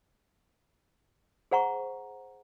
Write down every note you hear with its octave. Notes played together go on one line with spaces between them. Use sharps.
G#4 C5 F#5 A#5 C#6